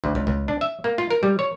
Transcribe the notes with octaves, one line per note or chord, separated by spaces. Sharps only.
D2
C#2
C#2
D4
E5
A#3
F4
A#4
G3
C#5